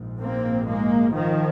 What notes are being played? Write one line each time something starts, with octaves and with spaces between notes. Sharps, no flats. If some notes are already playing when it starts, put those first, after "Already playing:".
Already playing: A#1 G#2
A#3 C4
G#3 A#3
D#3 F3